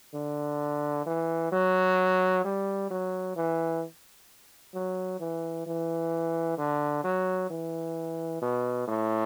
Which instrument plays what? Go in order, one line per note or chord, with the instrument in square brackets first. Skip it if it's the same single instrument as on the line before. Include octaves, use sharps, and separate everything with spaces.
[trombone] D3
E3
F#3
G3
F#3
E3
F#3
E3
E3
D3
F#3
E3
B2
A2